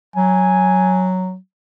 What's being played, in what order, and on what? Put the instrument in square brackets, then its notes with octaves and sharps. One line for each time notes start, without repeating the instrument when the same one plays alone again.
[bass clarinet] F#3 [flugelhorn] G#5